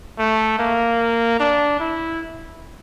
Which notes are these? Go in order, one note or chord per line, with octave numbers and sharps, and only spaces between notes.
A3
A#3
D4
E4